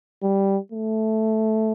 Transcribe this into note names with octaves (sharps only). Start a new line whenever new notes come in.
G3
A3